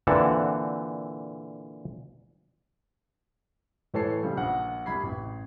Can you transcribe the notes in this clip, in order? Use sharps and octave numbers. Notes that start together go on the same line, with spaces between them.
A#2 D3 E3 C4 F#5 A5
A2 E3 A4 C#5 A5 C7
C#3 F3 G3
A#1 F#5
C2 B5 G#6 C7
A1